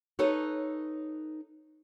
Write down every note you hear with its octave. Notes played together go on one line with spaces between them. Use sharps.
D#4 A4 B4 C#5